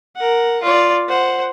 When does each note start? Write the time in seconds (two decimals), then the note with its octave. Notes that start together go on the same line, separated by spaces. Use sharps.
0.16 A#4 F#5
0.62 F4 D5
1.08 C5 F#5